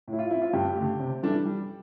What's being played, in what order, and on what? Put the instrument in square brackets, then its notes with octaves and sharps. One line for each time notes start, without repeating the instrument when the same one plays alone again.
[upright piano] A2
[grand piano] E4
F4
[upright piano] F3 C4 [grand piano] E4
[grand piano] F4
[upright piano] G2 [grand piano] G4
[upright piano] D3 A3
C3
E3 G3 D4 A4
G3